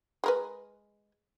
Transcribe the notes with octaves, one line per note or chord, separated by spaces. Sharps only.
G#3 A#4 B4